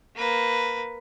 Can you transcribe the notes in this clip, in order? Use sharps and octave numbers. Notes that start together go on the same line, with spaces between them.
A#3 B4